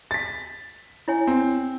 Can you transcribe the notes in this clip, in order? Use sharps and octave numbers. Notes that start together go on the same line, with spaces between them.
A6 B6
E4 C#5 G#5
C4